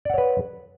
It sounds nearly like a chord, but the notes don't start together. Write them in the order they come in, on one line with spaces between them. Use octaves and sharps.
D5 F#5 C#5 B4